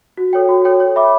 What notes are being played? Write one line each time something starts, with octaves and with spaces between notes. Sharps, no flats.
F#4
A4 C#5 G5
F#4
A4 C#5 G5
C#5
E5 B5 D6